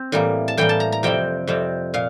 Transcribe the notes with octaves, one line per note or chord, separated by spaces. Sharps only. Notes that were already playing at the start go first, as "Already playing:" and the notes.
Already playing: C4
A2 E3 G3 A#3
A5
A2 E3 G3 A#3 G5
A5
A#5
A#5
F2 C3 G3 C4 G5
F2 C3 G3 C4
A#2 F5